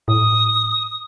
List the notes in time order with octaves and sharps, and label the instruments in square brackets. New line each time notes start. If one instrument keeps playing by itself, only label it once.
[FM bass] A2 [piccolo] D#6